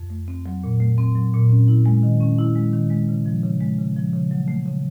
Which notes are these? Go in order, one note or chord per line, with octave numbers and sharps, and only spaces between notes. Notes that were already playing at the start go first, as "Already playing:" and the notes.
Already playing: F2
A3
C4
F#3
A#2
A3
C4
F#3
A#2
C#4
E4
G#3
D#3
C#4
E4
G#3
D#3
G#3
C#3
F3
C#3
G#3
C#3
F3
C#3
F#3
A3
C#3